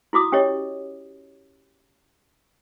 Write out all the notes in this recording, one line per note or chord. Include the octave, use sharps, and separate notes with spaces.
E4 F#4 D6 D#6
C#4 G4 C#5 D#5